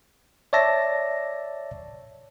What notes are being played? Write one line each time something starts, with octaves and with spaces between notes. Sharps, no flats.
C#5 D5 E5 A5 A#6